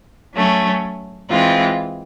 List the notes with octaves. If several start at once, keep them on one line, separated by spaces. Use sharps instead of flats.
F#3 A3 C#4
E3 G#3 C4 F4